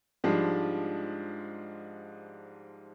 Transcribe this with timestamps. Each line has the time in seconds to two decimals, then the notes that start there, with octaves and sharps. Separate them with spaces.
0.24 G#2 F3 G3 G#3 D4